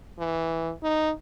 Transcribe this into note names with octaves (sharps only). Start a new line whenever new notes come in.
E3
D#4